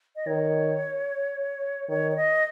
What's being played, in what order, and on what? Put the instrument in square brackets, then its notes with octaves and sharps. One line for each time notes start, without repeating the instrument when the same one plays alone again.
[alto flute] D#5
[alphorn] D#3 [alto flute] C#5
[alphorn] D#3 [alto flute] C#5
[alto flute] C#5
D#5